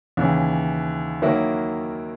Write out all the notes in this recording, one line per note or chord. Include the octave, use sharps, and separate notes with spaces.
D#2 C#3 E3
D#3 F#3 A#3 E4